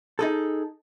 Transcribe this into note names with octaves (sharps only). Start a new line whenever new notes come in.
D#4 G#4 A4